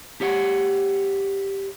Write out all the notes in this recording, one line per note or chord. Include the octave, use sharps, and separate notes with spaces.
G4 C#5 F#5